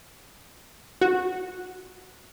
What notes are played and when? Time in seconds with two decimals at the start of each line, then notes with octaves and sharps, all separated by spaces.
1.01 F#4